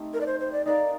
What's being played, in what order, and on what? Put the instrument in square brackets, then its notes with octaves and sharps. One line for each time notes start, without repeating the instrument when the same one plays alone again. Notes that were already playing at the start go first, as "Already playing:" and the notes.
Already playing: [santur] A3 C4 D#4 G4
[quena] A#4
D5
C5
C5
D5
[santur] D#4 A#4 F5 [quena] D5